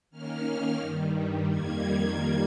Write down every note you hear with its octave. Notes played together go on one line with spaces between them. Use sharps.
D#3 A#3 C#4 F6
G2 D#3 G3
F2 D#3 G3 A#3 G#6